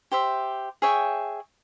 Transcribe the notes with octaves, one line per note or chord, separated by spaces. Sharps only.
G4 C5 E5
G#4 C#5 E5 G5